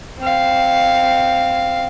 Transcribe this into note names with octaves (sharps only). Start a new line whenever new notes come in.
C4 F5